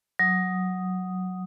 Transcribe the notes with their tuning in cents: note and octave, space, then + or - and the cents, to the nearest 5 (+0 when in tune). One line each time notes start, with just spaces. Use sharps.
F#3 +0 D#6 +0